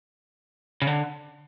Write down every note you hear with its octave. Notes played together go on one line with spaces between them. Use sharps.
C#3
D3